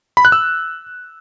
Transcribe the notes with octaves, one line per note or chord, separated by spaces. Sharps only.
B5
F#6
E6